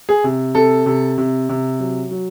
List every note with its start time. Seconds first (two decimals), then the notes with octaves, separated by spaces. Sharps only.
0.09 G#4
0.24 C3
0.55 C3 A4
0.86 C3
1.18 C3
1.49 C3
1.79 F#3
2.11 F#3